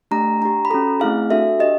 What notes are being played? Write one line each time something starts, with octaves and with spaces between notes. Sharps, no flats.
A3 D4 G4 A#5
D4 G4 A#5
B5
C#4 F#4 A4 A#5
A3 C4 E4 G#4 F5
D4 F#4 A4 E5
D4 G4 D#5